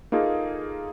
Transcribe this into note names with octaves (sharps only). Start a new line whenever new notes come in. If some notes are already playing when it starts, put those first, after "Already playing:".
A#3 D#4 F4 G#4 A4